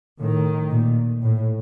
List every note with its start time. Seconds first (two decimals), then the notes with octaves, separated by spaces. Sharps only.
0.20 A2 D#3
0.71 A#2
1.22 A2